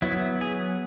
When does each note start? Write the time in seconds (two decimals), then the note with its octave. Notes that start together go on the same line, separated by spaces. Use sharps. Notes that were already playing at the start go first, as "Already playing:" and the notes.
0.02 F#3 B3 E4
0.41 G#4